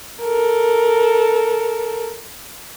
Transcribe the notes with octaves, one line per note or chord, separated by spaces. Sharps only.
A4 A#4